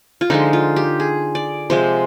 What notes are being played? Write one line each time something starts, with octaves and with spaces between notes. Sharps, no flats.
F4
D3 F3 G#3 D#4
F4
G4
G#4
D5
C3 F3 G#3 C5